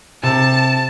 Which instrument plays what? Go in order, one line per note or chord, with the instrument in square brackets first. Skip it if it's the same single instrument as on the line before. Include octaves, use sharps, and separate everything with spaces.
[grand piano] C3 [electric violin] A5